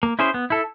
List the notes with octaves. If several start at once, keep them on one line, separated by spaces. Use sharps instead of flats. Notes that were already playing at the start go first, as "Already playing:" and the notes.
A#3
C#4 E4 G#4 C5
B3
E4 A4